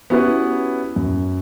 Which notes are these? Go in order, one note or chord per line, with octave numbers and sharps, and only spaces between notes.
B3 C#4 E4 F#4 G4 B4
F#2